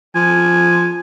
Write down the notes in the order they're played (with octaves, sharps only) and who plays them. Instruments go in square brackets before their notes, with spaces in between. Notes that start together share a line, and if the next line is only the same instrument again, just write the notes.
[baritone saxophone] F3 [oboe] G#5